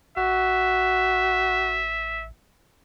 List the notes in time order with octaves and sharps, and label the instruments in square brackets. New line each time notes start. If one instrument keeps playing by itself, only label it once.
[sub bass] A1 [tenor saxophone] F#4 [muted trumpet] E5